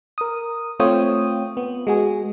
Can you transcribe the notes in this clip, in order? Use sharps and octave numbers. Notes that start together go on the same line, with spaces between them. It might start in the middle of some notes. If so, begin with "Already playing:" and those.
A#4 D#6
A3 C4 F4 C#5 G5 D#6
B3
G#3 F#4 G#4